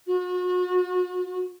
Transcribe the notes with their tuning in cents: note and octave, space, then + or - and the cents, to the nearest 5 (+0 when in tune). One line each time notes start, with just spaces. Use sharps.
F#4 -40